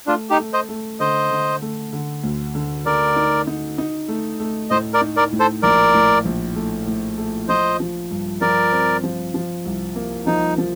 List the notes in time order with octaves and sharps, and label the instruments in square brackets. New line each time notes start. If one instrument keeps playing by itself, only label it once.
[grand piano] A3 [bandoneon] D4 F4
[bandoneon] D#4 G4
[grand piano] A3
[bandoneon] C5 D#5
[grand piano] A3
[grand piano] D3 [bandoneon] C5 D#5
[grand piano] D3
A3
D3
D2
D3
[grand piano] D3 [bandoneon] A#4 D5
[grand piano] D#4
D#4
D#4
A3
A3
[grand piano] A2 [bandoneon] C5 D#5
[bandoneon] A#4 D5
[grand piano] D#4
[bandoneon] A#4 D5
[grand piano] A2
[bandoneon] A4 C5
[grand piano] A#1 [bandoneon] A#4 D5
[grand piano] A2
A#1
A3
A2
A3
[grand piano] F3 [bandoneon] C5 D#5
[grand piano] F3
G2
[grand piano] F3 [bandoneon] A#4 D5
[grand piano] C4
F3
F3
C2
A#3
[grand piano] F3 [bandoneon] D#4
[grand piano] F3